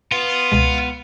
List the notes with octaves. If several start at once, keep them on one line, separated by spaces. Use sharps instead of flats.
B3 F4
C#2 B2 G#3